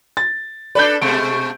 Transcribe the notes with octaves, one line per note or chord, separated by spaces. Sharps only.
A6
D4 A4 B4 D5 G6
B2 G#3 A3 D7